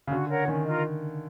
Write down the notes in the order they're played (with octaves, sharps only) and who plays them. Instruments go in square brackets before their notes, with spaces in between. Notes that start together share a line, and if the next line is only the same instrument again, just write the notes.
[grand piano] C#3
[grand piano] D3 [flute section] F#4
[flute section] A#4 C#5 F#5
[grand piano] D#3 [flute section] C#4
[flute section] F4 A#4 D#5